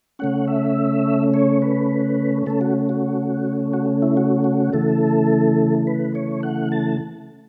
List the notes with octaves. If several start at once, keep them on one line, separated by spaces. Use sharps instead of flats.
C#3 A3 C#4 F#5
E5
C#5
B4
C#3 A3 C#4 A4
F#4
F#4
F#4
E4
F#4
F#4
C#3 E3 A3 A4
B4
C#5
F#5
A5